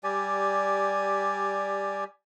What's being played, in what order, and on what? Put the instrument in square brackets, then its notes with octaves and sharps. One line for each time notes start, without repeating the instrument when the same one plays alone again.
[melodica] G3 G4 D5 G#5